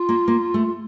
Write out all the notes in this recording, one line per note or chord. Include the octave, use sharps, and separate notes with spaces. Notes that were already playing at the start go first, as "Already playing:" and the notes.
Already playing: F4
A#3
A#3
A3